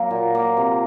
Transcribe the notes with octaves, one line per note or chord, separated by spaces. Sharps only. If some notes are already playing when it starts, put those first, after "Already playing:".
Already playing: F#3 A#3
A#2
A#3
C3